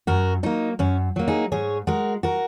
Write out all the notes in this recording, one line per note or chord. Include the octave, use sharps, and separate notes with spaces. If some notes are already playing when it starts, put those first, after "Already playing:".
F#2 F#4 A#4
F#3 A#3 D#4
F#2 C#4
F#3 A#3
D#4 G#4
G#2 G#4 C#5
G#3 F#4 A#4
F#4 A#4